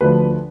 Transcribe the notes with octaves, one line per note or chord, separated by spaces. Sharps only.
D2 D3 F3 B4